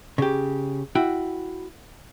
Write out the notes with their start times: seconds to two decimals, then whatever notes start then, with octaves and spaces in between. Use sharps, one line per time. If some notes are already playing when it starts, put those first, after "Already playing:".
0.18 C#3 G4
0.95 E4 F#4 G5